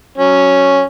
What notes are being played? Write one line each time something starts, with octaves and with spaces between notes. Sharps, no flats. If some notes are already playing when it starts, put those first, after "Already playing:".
F#3 C#4